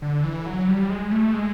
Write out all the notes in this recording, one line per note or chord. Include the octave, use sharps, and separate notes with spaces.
D3
E3
F#3
G3
G#3
A3
G#3